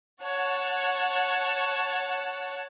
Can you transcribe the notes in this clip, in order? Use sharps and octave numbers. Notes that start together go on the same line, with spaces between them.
C#5 F#5 A5